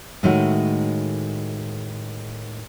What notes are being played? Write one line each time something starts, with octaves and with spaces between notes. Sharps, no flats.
A2 D#3 G#3 A3 D#4 F#4